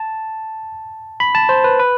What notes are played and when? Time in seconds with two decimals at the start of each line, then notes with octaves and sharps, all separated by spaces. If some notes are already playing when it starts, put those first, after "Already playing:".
Already playing: A5
1.20 B5
1.35 A5
1.49 C5
1.64 B4
1.79 B4